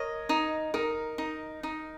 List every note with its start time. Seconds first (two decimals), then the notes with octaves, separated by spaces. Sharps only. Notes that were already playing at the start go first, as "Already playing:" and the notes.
Already playing: A#4 C#5 D#5
0.29 D#4
0.74 D#4 A#4
1.18 D#4
1.63 D#4